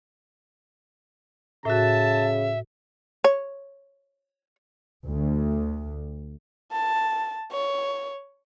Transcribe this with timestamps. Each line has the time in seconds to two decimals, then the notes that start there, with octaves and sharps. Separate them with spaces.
1.65 A2 C#3 F#4 E5 A5
3.24 C#5
5.06 D2
6.72 A5
7.52 C#5